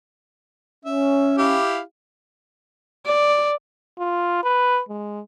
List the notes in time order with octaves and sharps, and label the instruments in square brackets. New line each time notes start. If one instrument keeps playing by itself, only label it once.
[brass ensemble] C#4 [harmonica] E5
[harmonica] E4 G4 F5
[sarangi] D5
[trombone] F4
B4
G#3